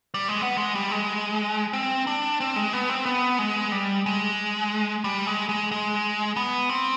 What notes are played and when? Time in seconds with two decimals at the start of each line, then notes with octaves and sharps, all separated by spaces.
0.14 G3
0.28 G#3
0.42 B3
0.58 G#3
0.75 G3
0.91 G#3
1.73 C4
2.07 D4
2.40 C4
2.56 G#3
2.73 B3
2.90 C4
3.06 B3
3.39 G#3
3.72 G3
4.06 G#3
5.04 G3
5.27 G#3
5.49 G#3
5.71 G#3
6.36 B3
6.69 C4